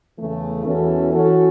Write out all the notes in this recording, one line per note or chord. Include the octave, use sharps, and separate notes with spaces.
E2 C#3 E3 A3
E2 E3 C#4 F#4 A4
E3 C#4 F#4 A4